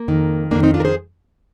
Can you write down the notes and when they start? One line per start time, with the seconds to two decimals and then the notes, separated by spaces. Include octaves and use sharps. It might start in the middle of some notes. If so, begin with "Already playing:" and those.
Already playing: A#3
0.08 F2 D#3
0.51 F2 D#3 A#3 D4
0.63 C4 D#4
0.74 D4 F4
0.80 A#4
0.85 G#4 C5